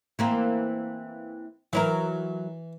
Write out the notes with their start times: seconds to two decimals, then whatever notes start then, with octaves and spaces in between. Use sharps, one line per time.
0.19 E3 A#3 C4
1.73 E3 F#3 E4 A#4